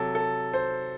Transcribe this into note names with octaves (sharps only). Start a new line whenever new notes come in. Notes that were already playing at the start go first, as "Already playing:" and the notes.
Already playing: C3 F#3 A4
A4
C5